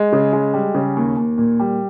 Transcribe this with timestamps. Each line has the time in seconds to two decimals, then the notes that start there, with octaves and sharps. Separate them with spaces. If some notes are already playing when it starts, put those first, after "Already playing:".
Already playing: G#3
0.13 C#3
0.33 G#3
0.54 G3
0.74 C#3
0.97 D#2
1.17 D#2
1.38 A#2
1.60 G3